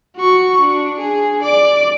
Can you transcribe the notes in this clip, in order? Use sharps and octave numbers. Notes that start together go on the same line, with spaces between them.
F#4 C#6
D4
G#4
D5 D6